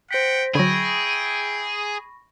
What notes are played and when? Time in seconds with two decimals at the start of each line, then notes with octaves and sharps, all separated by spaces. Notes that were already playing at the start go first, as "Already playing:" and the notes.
0.11 C5 F#5 G5 A#6 B6
0.55 D3 F#3 E4 G#4 G5 B5 C#6 A#6